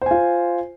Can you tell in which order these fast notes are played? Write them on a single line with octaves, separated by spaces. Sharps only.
C5 G#5 F4